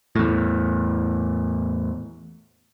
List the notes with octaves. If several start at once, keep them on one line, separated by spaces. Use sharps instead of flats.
E2 A2